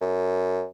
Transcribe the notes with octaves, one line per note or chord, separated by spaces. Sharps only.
F#2